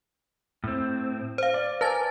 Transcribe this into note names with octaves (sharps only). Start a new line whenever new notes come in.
A2 C4
C5 F5
D5
A#4 B4 D5 G#5 A5 A6